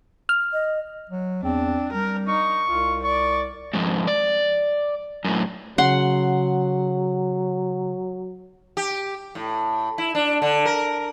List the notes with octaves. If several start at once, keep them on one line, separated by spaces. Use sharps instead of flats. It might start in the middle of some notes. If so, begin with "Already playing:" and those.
F6
D#5
F#3
E2 C4 D4
G3 A#4
D#4 C#6
C2 F4
D5 C#6
F2 G#2
D5
F#2 A2
C#3 F#3 F#5 C6
G4
A2
E4
D4
D3
A#4